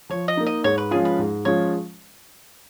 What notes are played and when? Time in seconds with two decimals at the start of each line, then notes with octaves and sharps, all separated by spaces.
0.10 F3 C#5
0.28 D#5
0.37 A#3 D#4
0.46 D#5
0.64 G#2 C#5
0.78 B4
0.91 F3 G#3 C#4 F4 G#4
1.05 B4
1.19 G#2
1.45 F3 G#3 C#4 F4 C#5